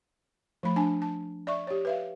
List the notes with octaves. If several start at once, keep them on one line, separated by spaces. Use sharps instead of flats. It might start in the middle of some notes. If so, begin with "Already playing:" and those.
F3 A3 B5
D4 G#5 A5
A5
D5 E5 C#6
G4 C#5
B4 E5 F5